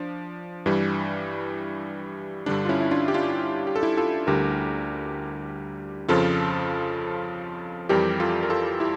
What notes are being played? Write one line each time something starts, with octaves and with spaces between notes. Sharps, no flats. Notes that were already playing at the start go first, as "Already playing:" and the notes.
Already playing: F3 D4
G2 E3 G3
G2 D3 G3 D4
F4
C#4 E4
E4
D4 F4
G4
D4 F4
G4
A4
E4 G4
F4 A4
D2 D3 G3 G4 A#4
F2 C#3 F3 F4 A4
F2 E3 G3 G4 A#4
F4 A4
A#4
F4 A4
E4 G4